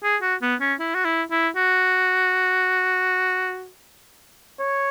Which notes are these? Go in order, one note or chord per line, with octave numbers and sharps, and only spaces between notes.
G#4
F#4
B3
C#4
E4
F#4
E4
E4
F#4
C#5